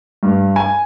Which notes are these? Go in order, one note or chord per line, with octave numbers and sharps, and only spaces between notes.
G2
G#5